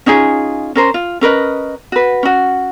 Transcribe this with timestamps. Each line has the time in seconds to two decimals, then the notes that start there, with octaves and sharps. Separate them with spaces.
0.06 C#4 D#4 F4 G#4
0.76 C#4 A#4 C5
0.94 F4
1.21 C#4 A#4 B4 D#5
1.92 F#4 B4
2.23 C#4 F#4